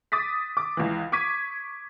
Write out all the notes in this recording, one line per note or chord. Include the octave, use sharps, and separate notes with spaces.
D6 D#6 A6 B6
D6
C#2 E3
C#6 D6 G#6 B6 D#7